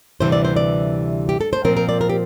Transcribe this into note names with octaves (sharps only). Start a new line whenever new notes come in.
D2 C3 E3 G3 C5
D5
C5
D5
G4
A4
C5
A#2 F3 C4 A#4
A#4
D5
A#4
G4